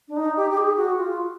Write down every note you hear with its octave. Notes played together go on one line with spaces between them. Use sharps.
D4
D#4
G4
G4
G#4
F#4
F4